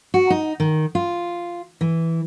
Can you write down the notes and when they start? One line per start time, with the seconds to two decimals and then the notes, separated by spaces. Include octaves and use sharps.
0.14 F#4
0.30 D#4
0.60 D#3
0.95 F4
1.81 E3